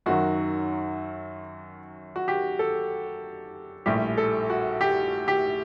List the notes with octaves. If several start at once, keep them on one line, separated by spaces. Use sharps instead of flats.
F#2 D#3 F#3 F#4
F#4
G4
A4
A#1 A2 G3 G4
A4
F#4
G4
G4